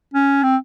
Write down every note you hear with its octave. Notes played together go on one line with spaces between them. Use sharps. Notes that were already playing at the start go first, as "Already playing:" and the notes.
C#4
C4